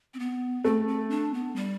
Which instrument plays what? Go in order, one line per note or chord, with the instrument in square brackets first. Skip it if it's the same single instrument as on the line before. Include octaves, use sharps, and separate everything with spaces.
[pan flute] C4
B3
[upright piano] A3 [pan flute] C4
[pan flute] C4
D4
B3
G3